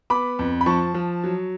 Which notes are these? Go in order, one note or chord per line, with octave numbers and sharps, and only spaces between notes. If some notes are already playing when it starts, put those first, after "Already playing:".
B3 B5 D6
F2
B5
F3 A5 C#6
F3
F#3